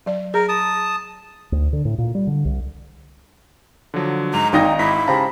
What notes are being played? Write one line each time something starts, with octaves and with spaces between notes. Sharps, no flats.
F#3 D5
G#4 A#4
A5 D#6
D2
D3
A2
A#2
G3
D3
C2
D3 F3 F#3
G#2 A#5 F7
G#1 D#4 G5 A#6
G#2 E4 B5 B6
C#3 G4 C5 F5 A5 A#5